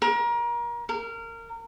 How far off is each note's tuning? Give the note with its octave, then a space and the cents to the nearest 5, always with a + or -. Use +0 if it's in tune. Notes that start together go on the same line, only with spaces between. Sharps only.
A#4 +30
A#4 -20